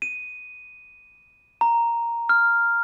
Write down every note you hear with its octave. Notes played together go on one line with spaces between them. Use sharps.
D#7
A#5
F6